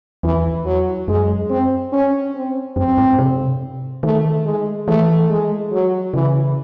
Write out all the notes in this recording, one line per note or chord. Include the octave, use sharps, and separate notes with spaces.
E2 E3
F#3
F#2 G#3
C4
C#4
C4
F#2 C4
G#2
C3
D#3 A3
G#3
E3 A3
G#3
F#3
C#3 E3